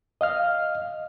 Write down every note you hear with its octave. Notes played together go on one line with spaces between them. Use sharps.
D#5 F5 F6